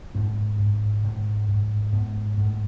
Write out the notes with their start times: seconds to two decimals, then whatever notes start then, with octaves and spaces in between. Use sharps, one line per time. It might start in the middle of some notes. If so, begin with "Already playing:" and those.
0.15 G#2 C4
0.59 G#2
1.03 G#2
1.48 G#2
1.93 G#2 B3
2.37 G#2 A3